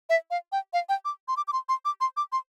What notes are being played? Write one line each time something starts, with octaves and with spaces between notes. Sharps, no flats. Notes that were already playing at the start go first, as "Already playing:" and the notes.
E5
F5
G5
F5
G5
D6
C6
D6
D6
C6
C6
D6
C6
D6
C6